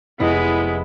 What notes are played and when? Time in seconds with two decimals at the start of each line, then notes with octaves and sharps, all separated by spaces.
0.20 F1 G#3 B3 E4 D#5 A#6